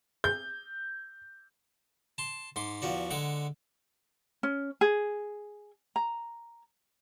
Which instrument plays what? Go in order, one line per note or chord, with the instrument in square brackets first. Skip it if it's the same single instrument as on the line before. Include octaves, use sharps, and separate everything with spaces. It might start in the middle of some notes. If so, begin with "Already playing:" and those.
[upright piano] G6
[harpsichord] A5 C6
G#2 C6 D6
E2 F3 F#4 D5
D3 G#3 F#5 D6
[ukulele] C#4
G#4
A#5